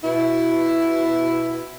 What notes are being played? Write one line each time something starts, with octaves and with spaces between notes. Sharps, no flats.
B2 E4